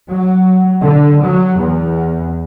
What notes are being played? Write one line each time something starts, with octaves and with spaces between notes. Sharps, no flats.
F#3
D3
F#3
E2